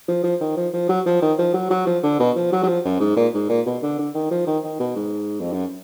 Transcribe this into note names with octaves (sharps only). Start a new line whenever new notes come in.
F3
F3
D#3
F3
F3
F#3
F3
D#3
F3
F#3
F#3
F3
D3
B2
F3
F#3
F#3
F3
F#2
G#2
A#2
G#2
A#2
B2
D3
D3
D#3
F3
D#3
D#3
B2
G#2
F2
F#2